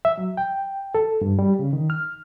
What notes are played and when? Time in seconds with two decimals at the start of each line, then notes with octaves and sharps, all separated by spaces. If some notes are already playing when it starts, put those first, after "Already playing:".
0.05 E5
0.18 F#3
0.37 G5
0.95 A4
1.21 G2
1.39 G3
1.59 C#3
1.73 D#3
1.90 F6